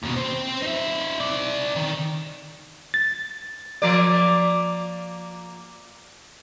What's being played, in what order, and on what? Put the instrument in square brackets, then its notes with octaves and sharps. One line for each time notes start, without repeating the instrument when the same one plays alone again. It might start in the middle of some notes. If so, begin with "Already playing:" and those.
[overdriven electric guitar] D#2 B2
C4 C5
D#4 E5
C4 D5
D#3
[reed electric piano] A6
[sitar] F3 A#3 D5